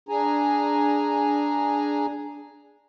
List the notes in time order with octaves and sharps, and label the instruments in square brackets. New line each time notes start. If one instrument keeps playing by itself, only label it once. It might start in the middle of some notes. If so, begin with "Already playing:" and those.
[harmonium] D4 G#4 G#5 A#5